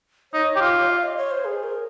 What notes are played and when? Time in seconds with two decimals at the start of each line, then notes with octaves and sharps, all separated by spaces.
0.33 D#4 C#5
0.56 G4
0.61 F4
0.89 F5
1.03 D#5
1.17 C#5
1.31 C5
1.45 G#4
1.64 A#4